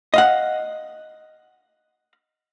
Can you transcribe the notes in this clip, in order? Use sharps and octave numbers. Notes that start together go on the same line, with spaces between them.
D#5 F5 F#5